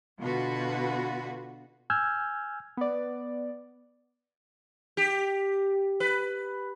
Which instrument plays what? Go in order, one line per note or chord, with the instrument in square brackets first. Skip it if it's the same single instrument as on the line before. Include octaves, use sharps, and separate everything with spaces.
[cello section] B2 D3 F4 F#4 B4
[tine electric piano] G#5 E6 F6 G6 G#6
[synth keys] B3 D5
[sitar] G4
B4